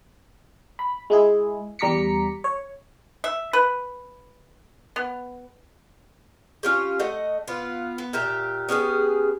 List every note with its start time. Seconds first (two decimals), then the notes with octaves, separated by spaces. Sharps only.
0.79 B5
1.10 G#3 E4 G#4
1.79 E2 G3 A#5 D6 B6 C#7
2.44 C#5
3.24 E5
3.53 B4
4.96 B3
6.63 C#4 F4 G4
6.99 A3 D#5 F#5
7.48 B3 F4
7.98 B3
8.13 A#2 G4 E5
8.69 B3 C#4 G4 G#4